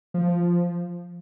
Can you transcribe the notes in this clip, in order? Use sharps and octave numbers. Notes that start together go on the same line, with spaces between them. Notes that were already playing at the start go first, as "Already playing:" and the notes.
F3